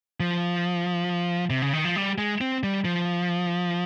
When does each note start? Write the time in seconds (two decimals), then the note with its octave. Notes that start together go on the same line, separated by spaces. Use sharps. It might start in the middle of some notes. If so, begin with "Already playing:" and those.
0.20 F3
1.50 C3
1.62 C#3
1.73 D#3
1.85 F3
1.96 G3
2.18 G#3
2.41 C4
2.63 G3
2.85 F3